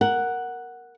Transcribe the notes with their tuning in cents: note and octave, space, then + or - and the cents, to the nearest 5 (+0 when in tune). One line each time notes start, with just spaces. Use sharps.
A#4 +0 F#5 +0